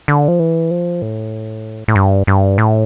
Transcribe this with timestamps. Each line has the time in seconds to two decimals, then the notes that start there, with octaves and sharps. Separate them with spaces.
0.08 D3
0.28 F3
0.39 E3
0.71 F3
1.02 A2
1.88 A2
1.95 G2
2.27 G2
2.58 A2